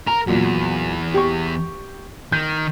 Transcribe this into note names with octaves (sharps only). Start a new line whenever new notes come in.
A#4 A#5
E2 A#2 F#3
G4 C#6
D#3 G6